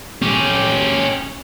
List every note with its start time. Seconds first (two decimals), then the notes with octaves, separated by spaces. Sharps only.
0.22 C#4 G4